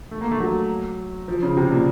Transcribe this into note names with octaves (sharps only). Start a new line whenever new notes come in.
A3
A#3
A3
F#3
F3
C#3
C3
A#2